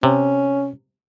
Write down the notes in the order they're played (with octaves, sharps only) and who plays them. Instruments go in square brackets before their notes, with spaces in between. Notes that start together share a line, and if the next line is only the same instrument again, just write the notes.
[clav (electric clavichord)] C3 [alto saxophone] C#4